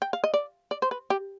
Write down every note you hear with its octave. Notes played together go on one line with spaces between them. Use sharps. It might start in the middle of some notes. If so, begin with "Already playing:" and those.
G5
F5
D#5
D5
D5
C5
B4
G4